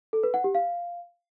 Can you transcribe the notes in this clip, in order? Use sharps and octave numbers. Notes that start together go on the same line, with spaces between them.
A4
B4
F#5
G4
F5